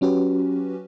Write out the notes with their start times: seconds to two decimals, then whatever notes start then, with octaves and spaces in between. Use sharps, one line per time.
0.01 F#3 C#4 F#4 G4 B4